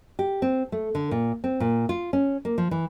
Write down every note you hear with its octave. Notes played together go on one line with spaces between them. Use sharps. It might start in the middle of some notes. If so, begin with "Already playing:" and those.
G4
C4
A3
D3
A#2
C4
A#2
F4
C#4
A#3
F3
E3